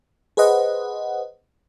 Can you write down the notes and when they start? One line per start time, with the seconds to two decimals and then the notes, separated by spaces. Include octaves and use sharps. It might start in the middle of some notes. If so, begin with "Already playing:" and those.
0.37 G#4 B4 C5 D#5 F#5